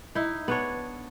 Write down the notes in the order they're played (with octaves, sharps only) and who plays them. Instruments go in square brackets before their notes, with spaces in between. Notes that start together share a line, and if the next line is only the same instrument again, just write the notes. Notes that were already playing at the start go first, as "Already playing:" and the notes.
[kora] D#4 E4
B3 D4 C#5